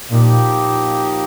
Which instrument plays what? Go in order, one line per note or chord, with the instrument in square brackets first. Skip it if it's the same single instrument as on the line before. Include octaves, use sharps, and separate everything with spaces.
[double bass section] A#2 [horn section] F3 A#3 D#4 G4